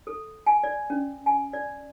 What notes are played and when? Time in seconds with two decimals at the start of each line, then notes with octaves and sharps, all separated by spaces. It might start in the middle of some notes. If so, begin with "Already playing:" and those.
0.07 A4
0.46 G#5
0.64 D5
0.90 C#4
1.26 G#5
1.53 D5